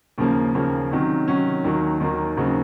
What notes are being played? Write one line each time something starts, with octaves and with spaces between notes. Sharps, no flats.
D#2 C#3 F3 A#3
D#2 C#3 F3 A#3
C3 D#3 F#3 C#4
C3 D#3 F#3 C#4
D#2 D#3 F#3 A#3
D#2 D#3 F#3 A#3
D#2 C#3 F#3 C4 D#4